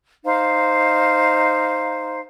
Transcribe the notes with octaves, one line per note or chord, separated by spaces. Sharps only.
D#4 C5 F5